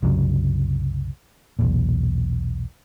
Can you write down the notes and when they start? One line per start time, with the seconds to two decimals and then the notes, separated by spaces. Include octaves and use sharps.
0.02 C2 F#2 C#3 F#3
1.59 B1 E2 A#2